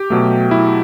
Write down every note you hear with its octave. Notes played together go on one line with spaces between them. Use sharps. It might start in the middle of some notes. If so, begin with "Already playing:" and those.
Already playing: G4
B2 F#3 A3
E4